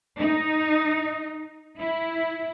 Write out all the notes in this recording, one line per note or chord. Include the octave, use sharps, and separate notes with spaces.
D#4
E4